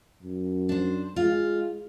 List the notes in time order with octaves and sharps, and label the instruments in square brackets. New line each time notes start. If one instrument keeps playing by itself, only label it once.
[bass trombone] F#2
[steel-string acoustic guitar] D4 C5
[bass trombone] G#3 [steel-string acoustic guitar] F4